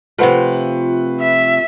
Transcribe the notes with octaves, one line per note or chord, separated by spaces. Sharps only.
C3 F3 A3 F4 B4 C5 F#5
E5